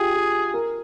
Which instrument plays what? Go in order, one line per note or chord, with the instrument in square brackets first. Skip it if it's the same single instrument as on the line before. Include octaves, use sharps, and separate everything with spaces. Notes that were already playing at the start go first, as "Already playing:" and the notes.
Already playing: [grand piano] F4 G4 [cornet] G#4
[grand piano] G4
A#4